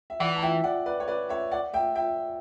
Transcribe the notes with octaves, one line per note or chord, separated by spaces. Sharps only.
E5
E3 D5 F#5
A5
E5 G5
D5 F#5
B4 D5
C#5
B4 D5
C#5 E5
D5 F#5
E5 G5
E5 G5